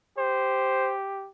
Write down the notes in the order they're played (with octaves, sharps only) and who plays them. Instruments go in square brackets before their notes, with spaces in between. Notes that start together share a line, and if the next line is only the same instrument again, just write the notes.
[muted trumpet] G4 [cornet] C5